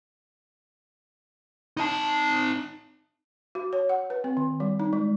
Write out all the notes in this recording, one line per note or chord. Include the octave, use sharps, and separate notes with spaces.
D#4 A5
F#4
C#5
F#5
B4
C4
D#3
G3
D#4
G#3